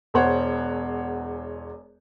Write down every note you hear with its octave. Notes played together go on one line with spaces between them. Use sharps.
E1 E2 C5 C#5 F#5